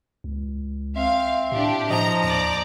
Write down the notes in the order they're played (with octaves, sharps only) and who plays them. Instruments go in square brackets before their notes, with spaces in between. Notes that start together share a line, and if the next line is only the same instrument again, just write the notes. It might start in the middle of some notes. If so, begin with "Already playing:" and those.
[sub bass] C#2
[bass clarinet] C4 [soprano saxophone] E5 [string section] F5
[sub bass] A2 [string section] D4 G4
[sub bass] A2 [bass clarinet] F3 [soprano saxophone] D#5 [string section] A#5
[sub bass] D#2 [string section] D5 A#5